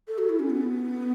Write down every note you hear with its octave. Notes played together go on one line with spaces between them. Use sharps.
A4
F#4
E4
C#4
B3